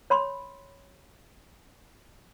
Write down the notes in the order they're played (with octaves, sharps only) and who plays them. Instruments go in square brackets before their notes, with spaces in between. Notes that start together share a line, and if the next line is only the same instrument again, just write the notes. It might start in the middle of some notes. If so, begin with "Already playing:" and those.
[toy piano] C#5 B5 C6